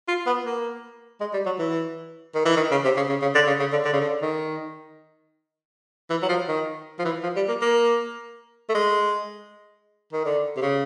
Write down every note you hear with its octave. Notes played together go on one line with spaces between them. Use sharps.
F4
B3
A#3
G#3
G3
F#3
E3
D#3
E3
D#3
C#3
C3
C#3
C#3
C#3
D3
C#3
C#3
D3
D3
C#3
D3
D#3
E3
F#3
F3
D#3
F3
E3
F3
G3
A#3
A#3
A3
G#3
D#3
D3
C3
C#3